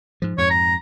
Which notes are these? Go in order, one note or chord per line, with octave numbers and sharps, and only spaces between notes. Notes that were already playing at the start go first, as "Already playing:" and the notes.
G#2 F3
F2 G#2 C#5
A#5